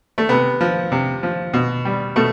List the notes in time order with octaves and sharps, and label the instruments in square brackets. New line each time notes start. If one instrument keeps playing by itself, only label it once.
[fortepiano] A3
C3 B3
F3
C3
F3
B2
G3
B2 A3